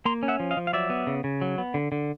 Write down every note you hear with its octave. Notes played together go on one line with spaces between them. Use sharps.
A#3 A#5 C6
C#4
E5 F#5
F3
D#5 F5
F3
F5
F#3 D5 E5
B3
C#3
C#3
F#3
B3
D3
D3